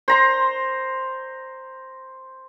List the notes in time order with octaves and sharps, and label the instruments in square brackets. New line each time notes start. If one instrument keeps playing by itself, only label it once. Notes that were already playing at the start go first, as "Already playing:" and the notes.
[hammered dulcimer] C5 A#5 C6